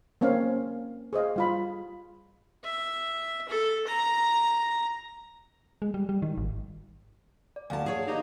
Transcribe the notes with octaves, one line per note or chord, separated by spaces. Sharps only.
A#3 C4 C#4 F5
G#4 C5 D#5 F5
G3 F4 B5
E5
A4
A#5
G#3
G3
G3
D#3
G#1
D5
D2 F5 F#5 G#5 A5
G#4 C#5
A#3 D#4 G4